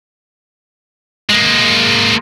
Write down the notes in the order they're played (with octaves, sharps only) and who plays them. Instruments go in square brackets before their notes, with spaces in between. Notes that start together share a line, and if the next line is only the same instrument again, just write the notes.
[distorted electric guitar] G#3 A#3